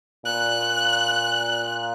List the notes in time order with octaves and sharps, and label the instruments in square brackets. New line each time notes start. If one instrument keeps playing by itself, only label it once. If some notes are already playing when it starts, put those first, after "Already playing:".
[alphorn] A#2 [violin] F#6